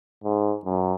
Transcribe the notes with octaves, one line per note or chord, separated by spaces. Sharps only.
G#2
F#2